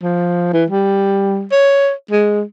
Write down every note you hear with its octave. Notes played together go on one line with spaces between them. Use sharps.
F3
E3
G3
C#5
G#3